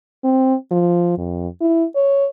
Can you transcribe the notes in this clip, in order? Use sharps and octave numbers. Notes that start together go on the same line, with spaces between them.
C4
F3
F2
E4
C#5